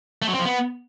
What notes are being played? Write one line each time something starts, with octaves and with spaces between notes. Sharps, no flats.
A3
F#3
C4
F3
B3